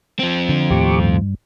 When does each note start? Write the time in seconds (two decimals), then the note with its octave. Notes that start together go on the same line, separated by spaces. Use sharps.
0.19 F3 C4
0.49 D3
0.71 D#2 A2 G4 C#6 D6
0.99 G2